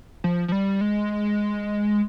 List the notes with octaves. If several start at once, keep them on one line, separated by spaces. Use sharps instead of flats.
F3
F3
G3
G#3